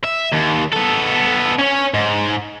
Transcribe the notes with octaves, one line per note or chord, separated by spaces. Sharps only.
E5
D#2
B3 A4
C#4 C#5
G#2